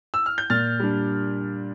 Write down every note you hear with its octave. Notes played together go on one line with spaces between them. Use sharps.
E6
F6
G6
A#2 F6 A6
G3 D4